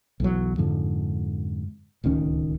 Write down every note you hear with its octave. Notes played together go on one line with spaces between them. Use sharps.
B1 E2 F#3
F2 G#2 D3 F3
D1 C#2 D#3 C#4